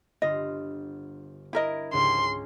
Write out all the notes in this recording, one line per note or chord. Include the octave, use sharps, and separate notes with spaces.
G1 F4 D#5
E4 A#4 D#5
C#2 G#2 G#4 C6